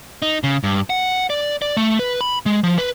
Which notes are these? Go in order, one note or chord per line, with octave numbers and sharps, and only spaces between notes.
D#4
C#3
G2
F#5
D5
D5
A3
B4
B5
G#3
F3
B4